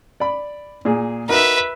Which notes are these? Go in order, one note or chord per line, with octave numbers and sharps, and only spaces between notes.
D5 B5
A#2 G#4
D#4 F#4 A#4 B4 E5